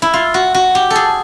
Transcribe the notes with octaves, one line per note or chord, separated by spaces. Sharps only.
E4
F4
F#4
F#4
G4
A4
G#4